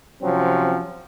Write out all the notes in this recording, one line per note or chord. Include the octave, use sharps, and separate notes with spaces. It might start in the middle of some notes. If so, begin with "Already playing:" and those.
C3 F3 F#3 C4 C#4